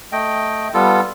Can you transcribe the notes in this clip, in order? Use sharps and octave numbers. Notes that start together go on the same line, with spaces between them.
A3 D#5 G5
G3 B3 F4 A4